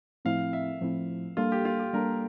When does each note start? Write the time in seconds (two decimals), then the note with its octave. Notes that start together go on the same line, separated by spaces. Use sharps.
0.25 A2 F3 A3 C4 E4 F5
0.53 E5
0.81 A2 F3 A3 C4 E4
1.37 G3 A#3 D4 F4 A4
1.52 G4
1.65 F4
1.80 G4
1.93 G3 A#3 D4 A4 A#4